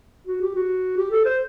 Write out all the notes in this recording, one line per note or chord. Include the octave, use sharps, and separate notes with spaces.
F#4
G4
F#4
G4
A4
C5